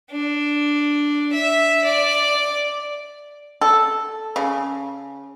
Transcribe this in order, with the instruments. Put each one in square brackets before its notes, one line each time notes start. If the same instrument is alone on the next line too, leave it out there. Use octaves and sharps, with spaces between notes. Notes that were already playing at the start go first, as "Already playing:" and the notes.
[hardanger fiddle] D4
E5
D5
[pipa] A4
C#3